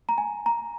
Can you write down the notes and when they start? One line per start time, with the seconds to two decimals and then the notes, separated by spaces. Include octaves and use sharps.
0.09 A#5
0.18 G#5
0.46 A#5